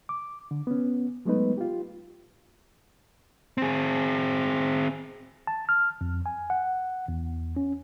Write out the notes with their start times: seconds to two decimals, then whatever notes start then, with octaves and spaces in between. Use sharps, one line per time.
0.09 D6
0.51 D3
0.67 B3 C#4
1.25 F#3 G#3 A3 B3 D#4 B4
1.58 F4 G4
3.58 C4 G#4
5.47 A5
5.69 F6
6.01 F2
6.26 G#5
6.50 F#5
7.08 E2
7.57 C#4